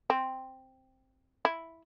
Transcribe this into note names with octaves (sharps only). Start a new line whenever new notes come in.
C4
E4